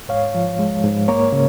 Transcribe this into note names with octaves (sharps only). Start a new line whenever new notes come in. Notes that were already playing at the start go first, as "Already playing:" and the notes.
G#2 C#5 F5
F3
G#3
G#2
A#3 A#4 C#5
C#3